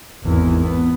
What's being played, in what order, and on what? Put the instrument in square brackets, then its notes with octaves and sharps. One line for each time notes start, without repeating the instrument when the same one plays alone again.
[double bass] G#1 E2
B3